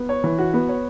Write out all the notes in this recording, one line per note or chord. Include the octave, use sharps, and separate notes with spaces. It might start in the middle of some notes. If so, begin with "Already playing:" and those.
Already playing: B3
C#5
E3
F#4
B3
C#5